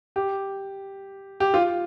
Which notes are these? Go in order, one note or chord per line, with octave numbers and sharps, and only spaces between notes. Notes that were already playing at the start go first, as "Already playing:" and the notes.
G4
G4
F4